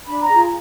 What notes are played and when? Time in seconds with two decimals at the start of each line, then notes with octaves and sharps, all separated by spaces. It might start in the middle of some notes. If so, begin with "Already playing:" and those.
0.05 D4 B5
0.22 A#5
0.29 F4 G#4